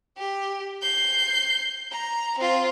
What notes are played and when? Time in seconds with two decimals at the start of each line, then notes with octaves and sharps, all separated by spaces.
0.18 G4
0.82 G6 C7
1.92 A#5
2.38 C4 F4